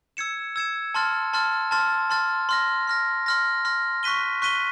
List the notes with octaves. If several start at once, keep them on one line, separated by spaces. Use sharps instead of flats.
E6 G#6 C#7 E7
E6 G#6 C#7 E7
A5 C6 F6 A6
A5 C6 F6 A6
A5 C6 F6 A6
A5 C6 F6 A6
C6 F6 A#6
C6 F6 A#6
C6 F6 A#6
C6 F6 A#6
C#6 F#6 B6 D#7 G7
C#6 F#6 B6 D#7 G7